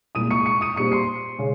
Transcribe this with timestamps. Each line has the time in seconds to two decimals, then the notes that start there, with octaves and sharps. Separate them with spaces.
0.15 C2 A#2 G#3 D#6 D#7
0.31 C#6 C#7
0.46 C#6 C#7
0.61 D#6 D#7
0.76 A#2 G3 C4 C#6 C#7
0.92 C6 C7
1.38 C#3 G#3 C#4